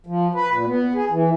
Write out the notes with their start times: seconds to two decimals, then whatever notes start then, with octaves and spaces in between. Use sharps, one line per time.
0.06 F3
0.34 B4
0.51 A#2
0.66 B3
0.95 G#4
1.10 E3